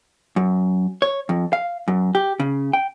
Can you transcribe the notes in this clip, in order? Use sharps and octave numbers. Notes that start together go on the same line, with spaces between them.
F#2
C#5
F2
F5
F#2
G4
C#3
G5